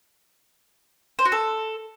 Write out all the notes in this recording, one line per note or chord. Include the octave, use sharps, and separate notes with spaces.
C5
F#4
A4